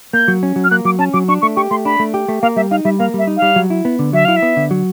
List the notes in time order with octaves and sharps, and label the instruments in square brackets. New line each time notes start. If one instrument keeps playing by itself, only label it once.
[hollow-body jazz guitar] A#3 [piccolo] G6
[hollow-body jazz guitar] F#3
C#4
F#3
[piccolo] F6
[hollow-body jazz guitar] A#3 [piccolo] F#6
[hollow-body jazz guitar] F#3 [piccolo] D6
[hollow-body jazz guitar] C#4 [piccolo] A5
[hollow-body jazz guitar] F#3 [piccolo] D6
[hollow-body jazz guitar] D4 [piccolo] C#6
[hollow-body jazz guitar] A3 [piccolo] C#6
[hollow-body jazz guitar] G4 [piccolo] C#6
[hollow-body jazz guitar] A3 [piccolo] C6
[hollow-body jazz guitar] D4 [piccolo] B5
[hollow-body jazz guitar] A3
G4
A3
[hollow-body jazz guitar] A#3 [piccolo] F5
[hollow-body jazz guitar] G3 [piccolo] E5
[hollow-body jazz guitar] D#4 [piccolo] F5
[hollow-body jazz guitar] G3 [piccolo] E5
[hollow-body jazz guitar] A#3 [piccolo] F5
[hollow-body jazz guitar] G3 [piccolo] E5
[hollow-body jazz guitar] D#4
[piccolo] F5
[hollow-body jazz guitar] G3
F#3
E4
B3
D3
[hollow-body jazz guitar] F#3 [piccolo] E5
[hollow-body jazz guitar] E4 [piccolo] F5
[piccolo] E5
[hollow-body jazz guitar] B3
D3
F#3